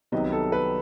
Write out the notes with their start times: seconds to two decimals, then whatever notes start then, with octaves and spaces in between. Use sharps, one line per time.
0.12 C2 C3 D#3 F#3 B3 D#5
0.32 A4
0.52 B4